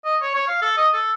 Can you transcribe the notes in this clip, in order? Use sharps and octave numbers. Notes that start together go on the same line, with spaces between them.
D#5
C#5
C#5
F5
A4
D#5
A4